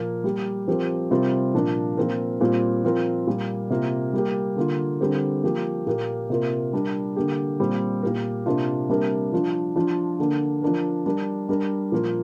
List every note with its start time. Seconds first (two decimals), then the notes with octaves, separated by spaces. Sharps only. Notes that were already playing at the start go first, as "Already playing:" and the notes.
Already playing: A#2 F3 A#3
0.24 G3 A#3 G4
0.68 F3 C4 G4 A#4
1.11 C3 G3 C4 F4 A#4
1.54 A#2 F3 D4 A#4
1.97 A#2 F3 C4 A#4
2.40 A#2 G3 C4 F4
2.84 F3 C4 F4 A#4
3.27 A#2 G3 A#3
3.70 C3 A#3 F4 A#4
4.13 G3 A#3 G4
4.56 D3 A#3 F4
5.01 D3 G3 C4 G4 A#4
5.44 F3 A#3 G4
5.87 A#2 A#3 G4 A#4
6.30 C3 A#3 F4 A#4
6.73 G3 D4 A#4
7.16 D3 A#3 G4
7.60 A#2 G3 C4
8.02 A#2 A#3 G4 A#4
8.46 C3 A#3 D4 F4
8.89 C3 G3 A#3 D4 A#4
9.33 F3 D4 F4
9.76 F3 D4 F4
10.19 D3 A#3 D4
10.62 F3 D4 A#4
11.06 G3 D4 A#4
11.49 G3 D4 A#4
11.92 A#2 F3 A#3 F4 A#4